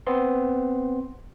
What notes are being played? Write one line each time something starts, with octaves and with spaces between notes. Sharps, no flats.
B3 C4 C6